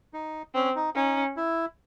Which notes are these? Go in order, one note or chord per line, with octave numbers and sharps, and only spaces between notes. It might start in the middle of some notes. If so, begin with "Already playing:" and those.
D#4
C4 C#4
D#4
C#4 D#4
E4